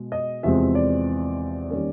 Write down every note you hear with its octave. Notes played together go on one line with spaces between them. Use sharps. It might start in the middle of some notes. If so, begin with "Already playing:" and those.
Already playing: B2 G#3
D#5
E2 C3 F3 G#3 C4 E5
D5
D#3 G3 A#3 C#4